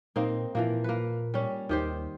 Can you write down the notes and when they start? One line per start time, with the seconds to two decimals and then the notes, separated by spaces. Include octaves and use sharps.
0.16 A#2 A#3 C4 D#4
0.55 A#2 E3 F3 A#3
0.84 A#3 B4
1.34 G3 C#4
1.69 D#2 D#3 G4 C5